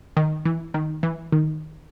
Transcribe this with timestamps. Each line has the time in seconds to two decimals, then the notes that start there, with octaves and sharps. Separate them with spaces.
0.17 D#3
0.45 E3
0.74 D#3
1.03 E3
1.32 D#3